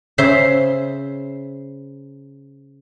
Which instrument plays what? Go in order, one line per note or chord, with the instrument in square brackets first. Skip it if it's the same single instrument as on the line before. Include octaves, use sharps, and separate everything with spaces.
[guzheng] C#3 C5 E5 C6